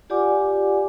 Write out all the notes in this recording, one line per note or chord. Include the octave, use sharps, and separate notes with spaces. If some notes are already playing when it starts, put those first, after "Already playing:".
F4 G4 D5 F#5 G#5 D6